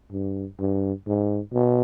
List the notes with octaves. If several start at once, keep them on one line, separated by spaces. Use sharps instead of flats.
G2
G2
G#2
B2